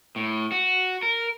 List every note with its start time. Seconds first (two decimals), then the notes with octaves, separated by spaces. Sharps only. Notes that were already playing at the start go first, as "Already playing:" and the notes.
0.16 A2
0.52 F#4
1.03 A#4